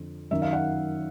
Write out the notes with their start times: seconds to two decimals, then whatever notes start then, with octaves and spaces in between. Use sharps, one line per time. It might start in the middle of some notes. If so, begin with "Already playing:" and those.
Already playing: F2 D3
0.31 F#2 D#3 E5
0.42 F5
0.53 F#5